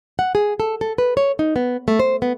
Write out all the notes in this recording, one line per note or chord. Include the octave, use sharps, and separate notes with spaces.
F#5
G#4
A4
A4
B4
C#5
D#4
B3
A3
C5
B3